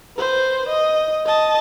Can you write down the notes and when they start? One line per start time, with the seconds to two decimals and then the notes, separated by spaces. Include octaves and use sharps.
0.17 B4 C5
0.69 D#5
1.26 D#5 A5